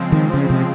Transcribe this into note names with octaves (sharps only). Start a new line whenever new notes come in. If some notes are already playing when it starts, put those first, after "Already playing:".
Already playing: C#3 F3 G#3 C4
D#3
C#3
C3